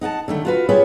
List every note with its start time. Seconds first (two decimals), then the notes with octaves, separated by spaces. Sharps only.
0.01 D#4 F#5 G#5 A5
0.28 D3 D#3 A3
0.45 F4 F#4 B4
0.69 F4 G4 G#4 B4 C#5